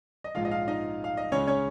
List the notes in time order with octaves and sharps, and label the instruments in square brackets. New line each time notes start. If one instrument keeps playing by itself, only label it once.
[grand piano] D#5
A#1 G#2 F3 G#3 F4 F5
D#5
F4 F5
D#4 D#5
F5
D#5
C#2 C#3 G#3 C#4 C#5
C#4 C#5